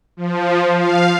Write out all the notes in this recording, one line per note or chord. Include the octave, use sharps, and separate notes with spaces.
F3
F5